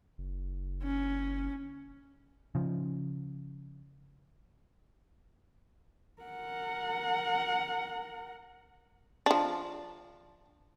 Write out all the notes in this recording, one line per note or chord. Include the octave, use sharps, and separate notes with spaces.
F#1
C#4
C#3 F3
A#4 F#5
F3 D4